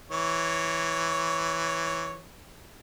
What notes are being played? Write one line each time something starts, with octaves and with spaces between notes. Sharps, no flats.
E3 C#5